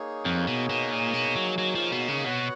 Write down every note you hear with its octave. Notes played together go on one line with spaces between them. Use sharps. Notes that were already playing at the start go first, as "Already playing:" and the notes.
Already playing: A#3 D#4 G#4 C#5
F2
B2
B2
A#2
B2
F#3
F#3
F3
B2
C#3
B2 B3 F#4 C#5 F#5